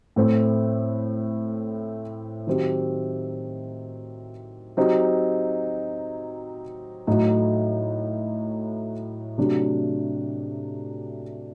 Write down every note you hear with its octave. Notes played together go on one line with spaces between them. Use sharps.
A2 A3 C4
D#3 F#3 C4 G4
F#3 C4 D#4 G4
A2 F#3 A3 D#4 F#4
C3 F#3 A3 D4